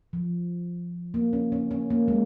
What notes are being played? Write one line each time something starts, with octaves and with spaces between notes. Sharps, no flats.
F3
A#3
C#4
C#4
C#4
A#3
G#3